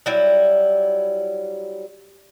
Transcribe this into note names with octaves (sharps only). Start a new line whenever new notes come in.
F#3 G3 E4